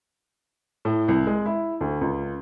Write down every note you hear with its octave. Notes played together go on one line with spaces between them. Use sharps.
A2
C2
G#3
E4
D2
C#2